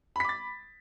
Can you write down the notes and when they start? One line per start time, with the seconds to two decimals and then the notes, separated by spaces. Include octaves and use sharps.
0.16 B5
0.20 B6
0.25 D6
0.29 A6